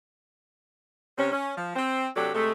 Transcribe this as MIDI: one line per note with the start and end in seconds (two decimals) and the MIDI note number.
1.17 1.31 48
1.17 1.31 60
1.17 1.31 61
1.31 1.54 61
1.55 1.71 53
1.74 2.06 60
2.14 2.30 48
2.14 2.30 54
2.14 2.30 62
2.14 2.30 67
2.14 2.30 69
2.33 2.52 48
2.33 2.52 56
2.33 2.52 57